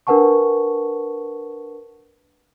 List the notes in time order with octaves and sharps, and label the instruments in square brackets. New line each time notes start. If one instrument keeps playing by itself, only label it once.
[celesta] D4 A#4 B4 F#5 A5 C#6